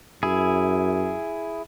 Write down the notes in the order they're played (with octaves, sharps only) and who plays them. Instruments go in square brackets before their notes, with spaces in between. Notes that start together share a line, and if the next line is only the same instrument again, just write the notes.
[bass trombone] F#2 [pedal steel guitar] E4 G#4